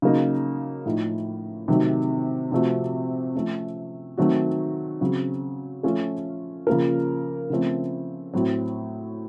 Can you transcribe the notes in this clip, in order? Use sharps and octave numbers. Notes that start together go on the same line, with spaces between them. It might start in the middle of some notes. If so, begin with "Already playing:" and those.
C#3 F#3 A#3 D#4
A2 F3 A3 D#4
C3 D#3 F#3 A3 D#4
C3 F3 A3 C4 F#4
F3 A3 C#4
D#3 F#3 A3 C4 F#4
C#3 F#3 C4
F3 A3 C#4 F4 A4
C#3 F3 A#3 F4 A#4
C#3 F3 A3 C4
A2 F#3 C4